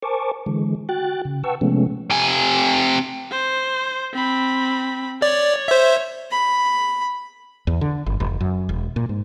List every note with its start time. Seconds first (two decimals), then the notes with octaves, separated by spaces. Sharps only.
0.02 A#4 C5 G#5 A5 C#6 D6
0.46 D3 E3 G#3
0.89 F#4 G5 F#6 A6
1.25 C#3
1.44 B4 F#5 G5 A5 C#6 E6
1.61 C3 F3 G#3 A3 B3 C#4
2.10 C3 G#5
3.31 C5
4.14 C4 B5
5.22 C#5 D5
5.68 C5 E5
6.31 B5
7.67 E2
7.81 D3
8.06 G1
8.20 F1
8.41 F#2
8.69 E1
8.96 A#2
9.09 G#2